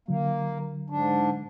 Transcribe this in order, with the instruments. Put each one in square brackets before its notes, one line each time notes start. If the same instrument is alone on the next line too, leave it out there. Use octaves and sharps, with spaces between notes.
[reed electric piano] D3 F#3 [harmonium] A#3
[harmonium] G#2 D4